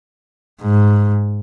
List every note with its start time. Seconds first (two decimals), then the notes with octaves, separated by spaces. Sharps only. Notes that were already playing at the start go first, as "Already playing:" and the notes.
0.61 G#2